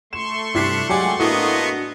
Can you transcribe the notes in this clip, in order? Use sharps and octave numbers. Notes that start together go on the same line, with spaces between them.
A3 C6 C#6 E7
G2 C3 D4 E4 B6 C7
F#3 G#3 G4 D5 F#5 G#5
A2 A#3 B3 D4 F#4 D#5